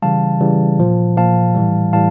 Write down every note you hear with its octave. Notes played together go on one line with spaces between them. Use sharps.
C#3 E3 G3 F5 A5
C#3 E3 G3
A#2 F3
A#2 F3 F5 A5
A2 E3 G3
A2 E3 G3 F5 A5